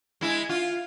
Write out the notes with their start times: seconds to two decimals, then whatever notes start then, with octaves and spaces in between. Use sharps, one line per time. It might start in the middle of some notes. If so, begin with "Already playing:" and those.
0.21 G#3 E4
0.49 F4